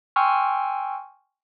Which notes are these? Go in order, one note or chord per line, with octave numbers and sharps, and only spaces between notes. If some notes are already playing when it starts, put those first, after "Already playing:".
G5 G#5 C6 C#6 E6 F6